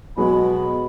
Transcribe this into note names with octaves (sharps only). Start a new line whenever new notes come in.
B2 F#3 G#3 B5